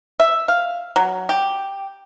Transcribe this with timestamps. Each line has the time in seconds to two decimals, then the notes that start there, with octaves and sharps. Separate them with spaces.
0.20 E5
0.48 F5
0.96 F#3
1.29 G4